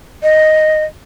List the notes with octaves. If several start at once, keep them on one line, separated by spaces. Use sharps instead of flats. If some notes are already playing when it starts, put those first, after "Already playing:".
D#5